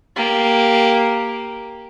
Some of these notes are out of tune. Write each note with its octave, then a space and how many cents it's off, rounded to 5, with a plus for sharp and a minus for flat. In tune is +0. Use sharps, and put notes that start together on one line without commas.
A#3 +0 G4 +0